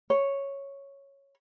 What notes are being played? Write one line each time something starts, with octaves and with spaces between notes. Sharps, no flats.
C#5